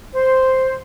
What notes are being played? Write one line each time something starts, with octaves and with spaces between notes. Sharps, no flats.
C5